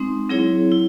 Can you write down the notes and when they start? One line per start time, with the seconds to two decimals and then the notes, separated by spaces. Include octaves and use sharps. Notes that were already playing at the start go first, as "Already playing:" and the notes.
Already playing: G#3 C4 D#4
0.29 F#3 C4 E4 G#4 C#5
0.72 E4